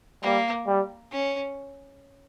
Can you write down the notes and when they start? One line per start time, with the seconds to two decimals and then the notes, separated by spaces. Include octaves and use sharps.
0.23 G3 A#3
0.67 G3
1.11 C#4